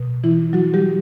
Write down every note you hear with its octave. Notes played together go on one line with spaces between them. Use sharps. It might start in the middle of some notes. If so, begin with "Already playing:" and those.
Already playing: B2
E3 E4
F#3 F#4
G3 G4